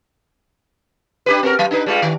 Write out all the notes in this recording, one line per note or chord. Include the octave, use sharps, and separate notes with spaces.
D4 G4 B4
C4 F#4 A#4
F#3
D4 D#4 B4
G3 G#3 F4
D#3